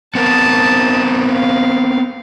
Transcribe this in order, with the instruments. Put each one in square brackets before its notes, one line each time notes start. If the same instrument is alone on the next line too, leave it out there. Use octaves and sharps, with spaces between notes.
[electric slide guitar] B3 C4 A#4 [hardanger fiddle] A5 D#6
[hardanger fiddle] F5